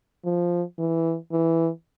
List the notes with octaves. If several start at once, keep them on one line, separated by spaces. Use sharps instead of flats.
F3
E3
E3